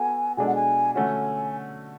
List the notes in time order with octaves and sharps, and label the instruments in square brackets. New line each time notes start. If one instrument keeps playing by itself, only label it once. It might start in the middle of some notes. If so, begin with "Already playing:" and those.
Already playing: [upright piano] B3 F#4 A4 [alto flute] G#5
[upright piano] B2 G#3 D4 A4 [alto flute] G#5
[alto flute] F#5
G#5
[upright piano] D3 A3 C#4 F#4 [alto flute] G#5